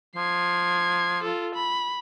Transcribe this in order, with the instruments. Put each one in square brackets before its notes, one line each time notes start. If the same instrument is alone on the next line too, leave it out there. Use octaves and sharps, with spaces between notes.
[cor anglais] F3 [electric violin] G#6 C7
[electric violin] F4 A4
B5